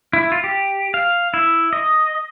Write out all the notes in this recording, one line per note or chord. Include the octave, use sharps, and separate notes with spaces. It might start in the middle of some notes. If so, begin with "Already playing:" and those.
E4
F4
G4
F5
E4
D#5